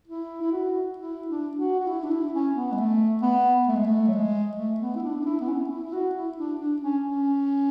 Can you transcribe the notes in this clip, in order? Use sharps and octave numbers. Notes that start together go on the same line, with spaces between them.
E4
E4
F#4
E4
D4
F#4
F#4
E4
D4
E4
C#4
B3
G#3
A3
B3
A3
G#3
A3
F#3
G#3
A3
B3
E4
D4
D4
E4
B3
C#4
E4
E4
F#4
E4
D4
D4
C#4
C#4